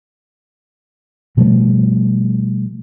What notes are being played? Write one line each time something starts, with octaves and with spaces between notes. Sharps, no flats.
B2 F3 G3 A3